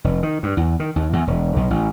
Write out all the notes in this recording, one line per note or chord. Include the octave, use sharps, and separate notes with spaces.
F1
D#3
G2
E2
D#3
D#2
E2
E1
B1
A1